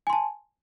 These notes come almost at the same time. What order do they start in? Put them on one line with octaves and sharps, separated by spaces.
G#5 C6 A5